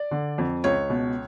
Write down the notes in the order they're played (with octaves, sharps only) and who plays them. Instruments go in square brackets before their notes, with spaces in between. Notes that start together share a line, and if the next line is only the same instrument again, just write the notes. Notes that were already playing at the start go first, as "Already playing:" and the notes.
Already playing: [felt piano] D5
D3
F2
C#2 C#5
B2